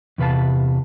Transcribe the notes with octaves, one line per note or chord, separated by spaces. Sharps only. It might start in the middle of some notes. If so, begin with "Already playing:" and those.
E2 C3 B4 F5 A5